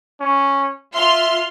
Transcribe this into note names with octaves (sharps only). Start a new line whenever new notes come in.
C#4
F4 E5 C6 F6